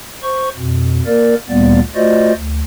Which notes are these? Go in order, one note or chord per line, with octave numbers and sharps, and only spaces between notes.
C5 C#6
F2 B2
A#3 A#4 D5
D2 A#2 G3 A#3 B3 D5
A3 F4 F#4 C5 D5 D#5
D2